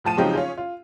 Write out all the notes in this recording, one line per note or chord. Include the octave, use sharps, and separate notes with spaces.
A2 F3 A5 D#7
C#3 F3 F#3 C4 D#4 G4
C#4 F4 G#4
F4